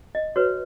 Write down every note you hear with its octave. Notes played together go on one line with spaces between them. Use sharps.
D#5
F#4 B4 C#5